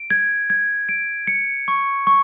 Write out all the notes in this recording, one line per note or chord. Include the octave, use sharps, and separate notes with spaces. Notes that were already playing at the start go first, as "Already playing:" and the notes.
Already playing: D7
G#6
G#6
D7
C#7
C#6
C#6